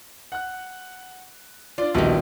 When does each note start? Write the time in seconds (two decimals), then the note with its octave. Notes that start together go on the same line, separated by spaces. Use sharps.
0.32 F#5 F#6
1.78 D4 F4 D5
1.94 A#1 B2 D#3 G3